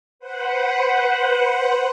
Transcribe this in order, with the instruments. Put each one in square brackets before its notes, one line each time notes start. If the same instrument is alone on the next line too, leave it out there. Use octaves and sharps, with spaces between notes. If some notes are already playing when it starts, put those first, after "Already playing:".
[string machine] B4 C5 F#5